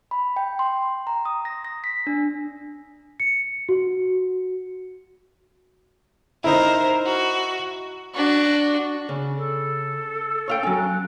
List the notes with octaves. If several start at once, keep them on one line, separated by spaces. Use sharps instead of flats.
B5
G5
C6
A#5
D#6
A#6
A#6
B6
D4
C#7
F#4
D#4 E4 A#4 C5
F#4
D4 F#4
C#3
A4
C#5 F5 G5
F#3 C#4
F#6